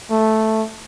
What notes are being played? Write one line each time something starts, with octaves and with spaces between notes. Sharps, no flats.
A3